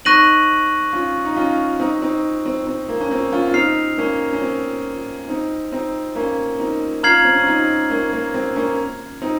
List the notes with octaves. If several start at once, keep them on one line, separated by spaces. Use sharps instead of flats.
C4 D#4 C#6 F#6 A#6 D#7 F#7
C#4 F4
D#4
C#4 F4
C4 D#4
C4 D#4
C4
C4
A#3
C#4
C4
C#4 F4
F4
C4 D#4 F6 C7 F7
A#3 C#4
C#4
C4
C4 D#4
C4 D#4
A#3 C#4
C4 D#4
C#4 F4 A#5 F6 G#6 C7 F#7
C4
C#4
C4 D#4
A#3 C#4
A#3
C4
A#3 C#4
C4 D#4